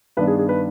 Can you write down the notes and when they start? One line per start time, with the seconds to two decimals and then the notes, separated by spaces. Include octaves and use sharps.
0.17 G2 D#3 B3 D4 B4
0.27 G#4
0.39 G#4
0.49 B4